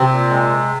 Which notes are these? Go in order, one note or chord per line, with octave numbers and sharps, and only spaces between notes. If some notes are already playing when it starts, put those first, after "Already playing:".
Already playing: C3 C4
A#2
G#3